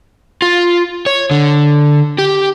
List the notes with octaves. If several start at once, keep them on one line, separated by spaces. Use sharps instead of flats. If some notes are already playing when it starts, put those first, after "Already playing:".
F4
C#5
D3
G4